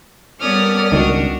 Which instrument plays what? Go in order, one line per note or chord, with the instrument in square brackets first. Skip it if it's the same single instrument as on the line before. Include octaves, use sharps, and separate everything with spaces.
[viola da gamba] G3 B3 C#4 [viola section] A4 A#4 D5 [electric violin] D#6 F6
[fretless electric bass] C#2 D#3 [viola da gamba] D4 F#4